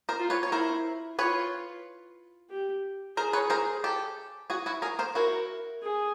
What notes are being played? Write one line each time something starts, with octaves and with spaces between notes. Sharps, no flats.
A#4 C5
F4
B4 C#5
C#5
E4 A#4 C5
F4 B4 C#5
G4
G#4 A#4 C5
B4 C#5
A#4 C5
G4 A4
F#4 G#4
E4 F#4
G#4 A#4
A#4 C5
E4 F#4 A#4
G#4